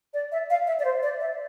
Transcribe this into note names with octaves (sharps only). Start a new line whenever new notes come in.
D5
E5
F5
E5
D5
C5
D5
E5